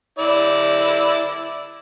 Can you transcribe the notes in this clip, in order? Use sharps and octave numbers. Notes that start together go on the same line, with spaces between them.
E4 D5